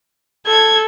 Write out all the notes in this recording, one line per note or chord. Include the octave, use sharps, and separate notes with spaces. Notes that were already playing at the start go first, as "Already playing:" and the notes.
A4 G#6